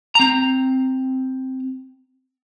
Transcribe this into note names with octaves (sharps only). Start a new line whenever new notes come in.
C4 A#5